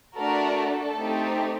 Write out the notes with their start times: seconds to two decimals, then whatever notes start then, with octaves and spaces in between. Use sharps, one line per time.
0.15 A3 D4 F#4 A4 A#4
0.56 A4
0.98 A3 C4 D#4 G4